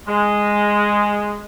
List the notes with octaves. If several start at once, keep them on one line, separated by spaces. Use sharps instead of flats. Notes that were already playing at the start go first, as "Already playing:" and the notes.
G#3